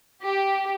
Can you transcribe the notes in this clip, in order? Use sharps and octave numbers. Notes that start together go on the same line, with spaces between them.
G4